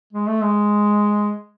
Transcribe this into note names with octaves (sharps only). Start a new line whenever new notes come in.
G#3
A3
G#3